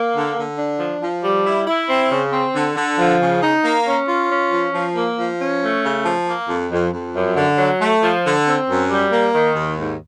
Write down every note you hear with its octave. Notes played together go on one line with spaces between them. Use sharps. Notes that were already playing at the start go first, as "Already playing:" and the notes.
Already playing: A#3
D3
D3
D4
F3
F3
G3
E4
E4
C4
C#3
C4
D3
D3
F3
C#3
D#4
A#3
C#4
F4
C#4
F3
F3
A#3
F3
C#4
A3
C#3
F3
A#3
F2
F2
F2
F#2
D3
F#3
A3
F3
D3
C4
F#2
G3
A#3
D#3
D#2
G#2